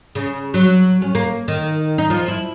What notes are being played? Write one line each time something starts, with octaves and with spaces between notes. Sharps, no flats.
C#3
F#3
C#4
A#3
D#3
D#4
F3
E4